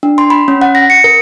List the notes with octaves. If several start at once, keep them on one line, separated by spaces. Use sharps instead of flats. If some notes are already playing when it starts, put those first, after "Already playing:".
D4
C6
B5
C#4
F#5
A#6
C#7
A#4